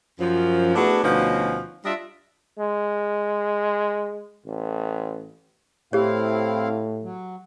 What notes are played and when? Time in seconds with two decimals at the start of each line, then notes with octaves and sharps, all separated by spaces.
0.20 F#2 F3
0.75 A3 B3 D4 E4 F#4 G#4
1.03 D2 B2 F3 C#4 D#4 F#4
1.85 G3 D4 F4 D#5 E5
2.59 G#3
4.46 A1
5.93 A2 C4 E4 G4 C#5 F5
7.03 F#3